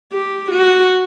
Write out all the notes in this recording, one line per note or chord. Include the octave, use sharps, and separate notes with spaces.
G4
F#4